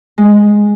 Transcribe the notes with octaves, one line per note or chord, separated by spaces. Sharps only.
G#3